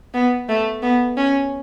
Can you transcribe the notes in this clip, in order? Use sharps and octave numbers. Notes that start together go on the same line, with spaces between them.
B3
A3
B3
C#4